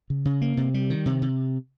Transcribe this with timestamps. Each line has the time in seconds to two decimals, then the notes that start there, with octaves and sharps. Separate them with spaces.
0.10 C#3
0.25 C#3
0.42 A#3
0.57 C3
0.74 G3
0.90 D#3
1.06 C3
1.22 C3